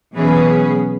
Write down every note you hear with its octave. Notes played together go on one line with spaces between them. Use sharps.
B2 E3 F#3 C#4 G#4 B4